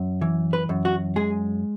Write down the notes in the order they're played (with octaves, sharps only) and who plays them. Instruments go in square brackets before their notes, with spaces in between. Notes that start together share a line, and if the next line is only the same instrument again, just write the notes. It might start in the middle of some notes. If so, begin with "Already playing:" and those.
Already playing: [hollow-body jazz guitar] F#2
E3
B4
F#2
F#4
G#3 G#4